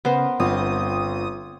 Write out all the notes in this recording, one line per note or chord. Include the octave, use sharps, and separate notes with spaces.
C#3 B3 A#4 C5
G1 C4 F4 D#6